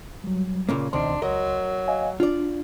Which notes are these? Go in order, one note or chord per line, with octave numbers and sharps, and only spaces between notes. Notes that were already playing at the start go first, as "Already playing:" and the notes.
F#3 G3
A#2 C#3 A#3
C#2 B2 D#3 C4 D4 C6
F#3 A#4 D#5
D#5 F5 G#5
D4 F4 D5